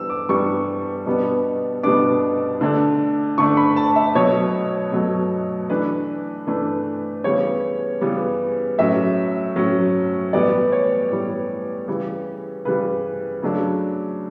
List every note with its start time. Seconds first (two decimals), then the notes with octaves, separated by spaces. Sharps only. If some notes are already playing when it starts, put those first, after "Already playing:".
Already playing: E3 G3 B3 D4 E6
0.10 D6
0.29 E3 G3 B3 D4 C#6
1.06 B2 G3 B3 D4
1.83 B2 G3 B3 D4 D6
2.61 D3 A3 D4
3.38 D3 A3 D4 C#6
3.57 B5
3.76 A5
3.96 E5
4.15 B2 F#3 A3 C#5
4.92 B2 F#3 A3
5.70 E3 A3 D4 B4
6.47 E3 A3 D4
7.24 C#3 E3 G3 B3 C#5
8.01 C#3 E3 G3 B3
8.78 A2 F#3 C#4 E5
9.56 A2 F#3 C#4
10.33 A2 E3 G3 B3 D5
10.72 C#5
11.10 A2 E3 G3 B3
11.88 C#3 E3 G3
12.65 C#3 E3 G3 B4
13.42 C#3 F#3 A3 D4